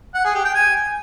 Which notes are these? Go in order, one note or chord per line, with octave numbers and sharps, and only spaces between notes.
F#5
G#4
G4
G5
G#5